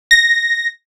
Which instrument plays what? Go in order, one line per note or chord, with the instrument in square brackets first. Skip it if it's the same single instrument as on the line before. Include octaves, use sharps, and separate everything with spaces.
[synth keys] A#6